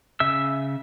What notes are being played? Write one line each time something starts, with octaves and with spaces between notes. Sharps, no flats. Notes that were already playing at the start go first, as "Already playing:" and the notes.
C#3 E5 E6